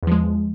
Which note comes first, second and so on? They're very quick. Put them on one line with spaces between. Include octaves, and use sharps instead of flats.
E2 F3 G#3